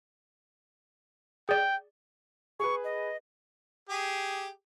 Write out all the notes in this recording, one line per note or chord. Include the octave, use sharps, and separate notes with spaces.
G#4 D5 G5
G#4 B4 C#6
D#5
G4 G#4